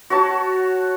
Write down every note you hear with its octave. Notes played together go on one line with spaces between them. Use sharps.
F#4 C#5 A5